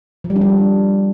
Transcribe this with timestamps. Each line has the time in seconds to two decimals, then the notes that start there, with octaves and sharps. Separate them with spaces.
0.24 F3
0.30 G3
0.36 D4
0.41 G3